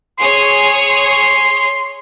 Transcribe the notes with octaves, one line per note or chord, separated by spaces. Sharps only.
G#4 C#5 C6
C6